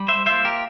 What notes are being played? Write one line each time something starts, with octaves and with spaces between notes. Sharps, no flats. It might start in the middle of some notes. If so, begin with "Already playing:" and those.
Already playing: G3
C5 E5
A#3 F4 C5 E5
G4 A#4